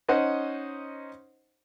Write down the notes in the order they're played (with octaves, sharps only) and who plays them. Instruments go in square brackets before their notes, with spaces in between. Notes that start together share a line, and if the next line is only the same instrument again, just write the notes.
[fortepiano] C#4 D#4 C5 D#5 F#5